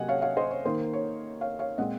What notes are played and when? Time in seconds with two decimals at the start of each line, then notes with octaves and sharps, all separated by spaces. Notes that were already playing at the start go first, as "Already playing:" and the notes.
Already playing: C3 F#3 A#3 D#5 F#5 G#5
0.09 C#5 F5
0.22 C#5 F5
0.37 C5 D#5
0.51 C#5
0.65 D#3 A#3 C5
0.93 C#5
1.41 C#5 F5
1.59 C#5 F5
1.78 A#2 G#3 C4 D#5 F#5